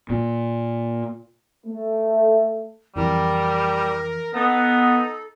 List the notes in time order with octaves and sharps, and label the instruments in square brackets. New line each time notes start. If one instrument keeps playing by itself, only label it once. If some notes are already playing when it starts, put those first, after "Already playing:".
[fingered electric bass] A#2
[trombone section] A3
[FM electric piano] F2 E3 [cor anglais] G3 [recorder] A#4
[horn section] B3 [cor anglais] D#4 [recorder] A4 [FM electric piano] D#6 A#6